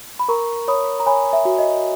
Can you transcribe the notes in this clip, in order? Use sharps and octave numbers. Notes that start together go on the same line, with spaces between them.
B5
A#4 A#5 C#6
C#5 B5 D#6
A#5
C#5 G#5 B5
E5
F#4
D#5